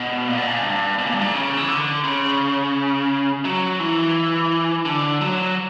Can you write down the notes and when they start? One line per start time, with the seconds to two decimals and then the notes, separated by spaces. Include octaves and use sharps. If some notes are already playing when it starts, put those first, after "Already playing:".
Already playing: B2
0.27 A#2
0.38 B2
0.48 A#2
0.63 G2
0.98 B2
1.06 A#2
1.13 G2
1.21 A#2
1.34 C#3
1.57 E3
1.68 D3
2.04 C#3
3.45 F#3
3.80 E3
4.85 D3
5.21 F#3